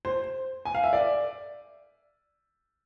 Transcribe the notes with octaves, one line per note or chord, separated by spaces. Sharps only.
C5
G#5
F5
E5
D5